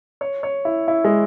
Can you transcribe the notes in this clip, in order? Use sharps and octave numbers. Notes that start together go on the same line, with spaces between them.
C#5
C#5
E4
E4
G#3